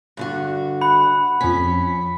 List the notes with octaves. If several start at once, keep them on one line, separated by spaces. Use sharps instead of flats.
G2 D3 F#4
F#5 B5
F2 C#4 B6